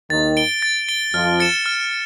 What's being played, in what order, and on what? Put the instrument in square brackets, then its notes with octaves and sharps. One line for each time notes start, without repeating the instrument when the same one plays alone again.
[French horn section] D#2 D#3 [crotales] A6
[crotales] D7 G7
A6
D7 G7
[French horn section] F2 F3 [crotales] F6
[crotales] A6 C#7 E7
F6